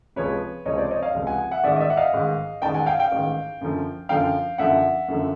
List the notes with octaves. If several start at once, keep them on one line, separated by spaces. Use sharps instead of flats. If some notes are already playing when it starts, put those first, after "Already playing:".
C#2 C3 F3 G#3 B4 C#5
C#2 C3 F3 G#3 C#5 D#5
C5 D5
C#5 D#5
D#5 F5
C#2 C3 F3 G#3
F#5 G#5
E5 F#5
A1 G#2 D#3 D5 E5
D#5
D5 E5
F#5
D#5 F5
A1 G#2 D#3
A1 G#2 D#3 G5 A5
F#5 G#5
F5 G5
F5 G5
A1 G#2 D#3
F#2 D3 F3
F#2 D3 F3 F5 G5
F#2 D3 F3 E5 F#5
F#2 D3 F3